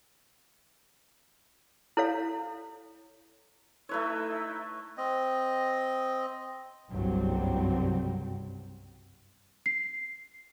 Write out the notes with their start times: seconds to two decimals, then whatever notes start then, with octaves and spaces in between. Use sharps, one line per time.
1.97 E4 A4 C#5 F5
3.89 A3 D#4 E4 B4 C#5 E6
4.98 C4 D#5
6.91 F#1 C2 G2 F#3 G3 C4
9.66 C7